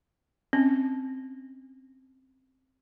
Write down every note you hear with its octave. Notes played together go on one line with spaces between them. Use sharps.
C4 C#4